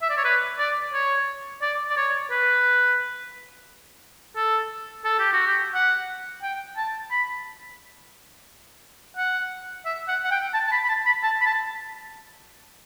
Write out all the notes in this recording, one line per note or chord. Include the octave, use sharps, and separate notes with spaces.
E5
D5
C#5
B4
D5
C#5
D5
D5
C#5
B4
A4
A4
G4
F#4
G4
F#5
G5
A5
B5
F#5
E5
F#5
F#5
G5
A5
A5
B5
B5
A5
B5
A5
B5
A5